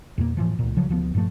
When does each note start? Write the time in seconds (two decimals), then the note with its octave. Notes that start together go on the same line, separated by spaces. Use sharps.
0.18 E2 A#2 A#3
0.37 A2 E3 F3
0.59 C#2 A#2
0.77 C#3 F3 F#3
0.89 D2 F3 F#3 B3
1.14 G2 A#2 F3 A3